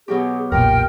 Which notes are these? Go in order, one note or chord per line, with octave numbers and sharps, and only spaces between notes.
B2 F#3 G4 G#4
F1 B1 A#2 F4 A#4 G5 F6